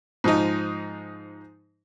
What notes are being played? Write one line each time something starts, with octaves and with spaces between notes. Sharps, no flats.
G#2 F3 D#4